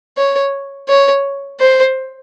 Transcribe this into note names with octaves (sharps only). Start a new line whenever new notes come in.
C#5
C#5
C5